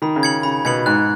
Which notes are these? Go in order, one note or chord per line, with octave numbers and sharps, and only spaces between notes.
D#3 B5
C#3
G#6 C#7 F#7
C#3 B5
B2 G#6 C#7 F#7
G#2 F#6